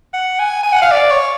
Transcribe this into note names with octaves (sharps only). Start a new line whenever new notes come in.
F#5
G#5
G#5
F#5
F5
D5
C#5